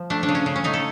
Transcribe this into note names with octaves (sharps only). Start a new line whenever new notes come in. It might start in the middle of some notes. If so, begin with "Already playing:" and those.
Already playing: F3
A3 D4
D4
C#3
C#4
C#3
C#4
A3 D#4
A4